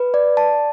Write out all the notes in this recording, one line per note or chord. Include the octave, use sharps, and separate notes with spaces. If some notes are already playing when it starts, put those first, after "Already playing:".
Already playing: B4
D5
A5